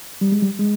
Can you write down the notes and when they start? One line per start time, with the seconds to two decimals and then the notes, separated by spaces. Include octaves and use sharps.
0.21 G3
0.32 G#3
0.42 G3
0.59 G#3